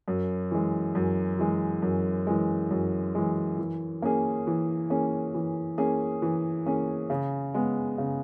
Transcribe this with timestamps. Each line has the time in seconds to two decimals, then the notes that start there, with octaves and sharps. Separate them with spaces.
0.08 F#2
0.51 E3 G#3
0.95 F#2
1.39 E3 G#3
1.82 F#2
2.27 E3 G#3
2.71 F#2
3.15 E3 G#3
3.59 E3
4.02 A#3 C#4 G#4
4.47 E3
4.90 A#3 C#4 G#4
5.34 E3
5.78 A#3 C#4 G#4
6.22 E3
6.66 A#3 C#4 G#4
7.10 C#3
7.54 G#3 B3
7.98 C#3